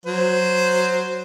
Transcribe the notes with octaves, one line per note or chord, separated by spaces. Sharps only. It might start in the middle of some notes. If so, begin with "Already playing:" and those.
F#3 C5